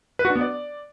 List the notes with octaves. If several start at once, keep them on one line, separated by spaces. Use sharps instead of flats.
B4
F#4
D4
B3
D5